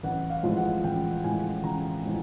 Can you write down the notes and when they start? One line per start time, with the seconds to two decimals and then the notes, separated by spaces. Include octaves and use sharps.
0.03 A1 F#5
0.30 F5
0.43 A2 F3 G#3
0.57 F#5
0.84 A1 G5
1.23 A2 F3 G#3 G#5
1.64 A1 A#5
2.03 A2 F3 G#3